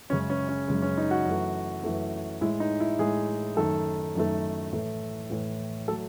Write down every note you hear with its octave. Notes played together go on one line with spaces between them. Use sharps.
F#2 C#3 G#3 C#4
C#4
C#4
F#2 C#3 G#3
C#4
D#4
F#4
F#2 E3 A3
F#2 E3 A3
A2 G#3 E4
D#4
E4
A2 G#3 G#4
F#2 D#3 A3 A4
F#2 D#3 A3
A2 E3 A3
A2 E3 A3
F#3 A3 A4